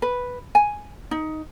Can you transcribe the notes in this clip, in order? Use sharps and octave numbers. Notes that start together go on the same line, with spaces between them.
B4
G#5
D#4